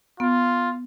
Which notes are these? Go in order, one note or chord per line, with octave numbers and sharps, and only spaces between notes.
B3 F4